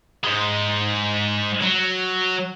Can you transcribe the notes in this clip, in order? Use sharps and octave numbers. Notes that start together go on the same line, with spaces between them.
G#2 G#3
F#3